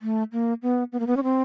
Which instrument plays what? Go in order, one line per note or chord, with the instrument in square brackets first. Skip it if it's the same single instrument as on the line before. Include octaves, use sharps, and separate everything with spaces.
[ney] A3
A#3
B3
B3
A#3
B3
C#4
C4